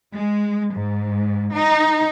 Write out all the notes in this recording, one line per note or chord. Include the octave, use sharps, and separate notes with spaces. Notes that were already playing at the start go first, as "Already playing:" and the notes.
G#3
G#2
D#4